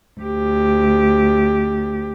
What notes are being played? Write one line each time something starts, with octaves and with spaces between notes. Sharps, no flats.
D2 G4